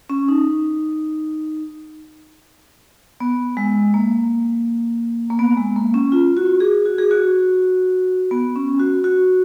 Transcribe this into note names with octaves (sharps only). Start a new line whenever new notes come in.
C#4
D#4
B3
G#3
A#3
A#3
B3
G#3
A#3
C#4
F4
F#4
G#4
F#4
G#4
F#4
B3
C#4
F#4
F#4